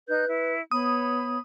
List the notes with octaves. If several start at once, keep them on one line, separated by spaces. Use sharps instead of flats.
D#4 B4 F#6 G6
E4
B3 C#5 B5 D#6